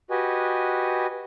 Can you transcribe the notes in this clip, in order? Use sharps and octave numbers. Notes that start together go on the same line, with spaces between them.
F#4 G4 B4 D#5 G#5